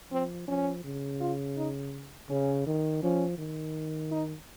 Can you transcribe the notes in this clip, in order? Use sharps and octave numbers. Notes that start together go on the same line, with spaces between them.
F3 C4
F3 C#4
C#3
F4
D#4
C#3 C#4
D#3
F3 C#4
D#3
D#4